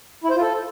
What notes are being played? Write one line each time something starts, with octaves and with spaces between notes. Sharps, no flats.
E4
C5
F4
A4